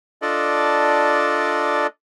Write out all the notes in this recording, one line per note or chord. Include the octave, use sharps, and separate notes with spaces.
D4 F4 A4 D5 D#5